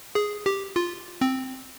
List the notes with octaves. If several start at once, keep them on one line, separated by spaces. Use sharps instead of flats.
G#4
G4
F4
C4